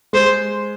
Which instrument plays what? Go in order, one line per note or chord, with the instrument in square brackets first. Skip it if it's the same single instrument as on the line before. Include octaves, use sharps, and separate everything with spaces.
[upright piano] G#3 [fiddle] C5